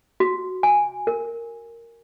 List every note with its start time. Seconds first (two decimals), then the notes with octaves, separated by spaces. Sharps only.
0.20 F#4
0.63 G#5
1.07 A#4